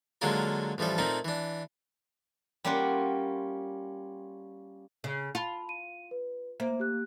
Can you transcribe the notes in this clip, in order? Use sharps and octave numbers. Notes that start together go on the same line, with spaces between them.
D3 F#3 G#3 A#3 F4 A#4
A1 E3 F3 G3 A4
A#2 A3 A#3 C4 D#4
E3 D4
G3 A#3 C#4 F4 G4 F#5
C#3
F4 A5 B5
D#7
B4
A#3 C5 E5
G4 F#6